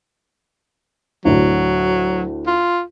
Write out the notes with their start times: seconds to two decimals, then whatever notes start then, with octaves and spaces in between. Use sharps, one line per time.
1.25 D2 A2 D3 F#3
2.47 F4